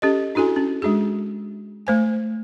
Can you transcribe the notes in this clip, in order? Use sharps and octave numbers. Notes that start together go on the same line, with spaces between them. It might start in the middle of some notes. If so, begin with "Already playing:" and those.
C#4 G4 A4 D#5
D4 E4 F#4 A4 G#5
C#4
G#3 D4 F#4 G#4
A3 C5 G#5